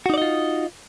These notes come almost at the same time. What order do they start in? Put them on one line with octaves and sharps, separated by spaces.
F#4 D#4 D5 D#5 F4